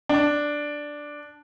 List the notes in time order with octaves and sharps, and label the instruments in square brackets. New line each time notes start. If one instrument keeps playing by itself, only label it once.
[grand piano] D4